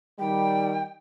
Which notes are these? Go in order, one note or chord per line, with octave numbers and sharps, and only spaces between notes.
D#3 G3 G5